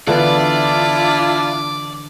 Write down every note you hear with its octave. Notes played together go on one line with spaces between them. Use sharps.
D3 E3 B3 D4 E4 F4 D5